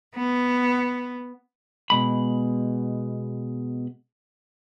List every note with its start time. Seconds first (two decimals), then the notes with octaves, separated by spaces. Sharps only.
0.15 B3
1.90 B2 G#3 B5